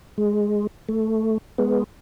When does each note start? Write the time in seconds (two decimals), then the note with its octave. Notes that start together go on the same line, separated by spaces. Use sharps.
0.18 G#3
0.89 A3
1.58 G#3 B3